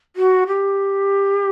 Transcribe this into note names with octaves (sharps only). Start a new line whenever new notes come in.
F#4
G4